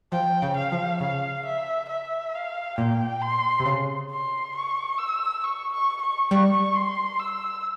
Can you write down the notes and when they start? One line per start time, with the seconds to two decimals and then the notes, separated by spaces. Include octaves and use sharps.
0.12 F3 G5
0.42 C#3
0.57 F5
0.72 F3
1.00 C#3 F5
1.45 E5
1.89 E5
2.34 F5
2.78 A#2 G5
3.22 C6
3.60 C3
3.66 C#3
4.11 C6
4.55 C#6
4.98 E6
5.43 C#6
5.72 C#6
6.02 C#6
6.31 G3 C#6
6.75 C6
7.20 E6